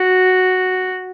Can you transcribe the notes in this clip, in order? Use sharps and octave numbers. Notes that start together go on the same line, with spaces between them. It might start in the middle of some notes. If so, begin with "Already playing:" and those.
Already playing: F#4